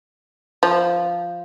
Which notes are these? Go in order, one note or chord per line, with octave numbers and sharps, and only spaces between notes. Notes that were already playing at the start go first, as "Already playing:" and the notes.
F3